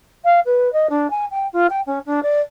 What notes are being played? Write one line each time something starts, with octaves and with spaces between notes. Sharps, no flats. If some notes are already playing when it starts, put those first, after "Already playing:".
F5
B4
D#5
D4
G#5
G5
F4
G5
C#4
D4
D5